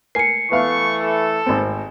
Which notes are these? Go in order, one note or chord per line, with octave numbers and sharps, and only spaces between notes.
A#4 G#5 C7 C#7
E3 A3 B3 F5 C#6
A4
G#1 C4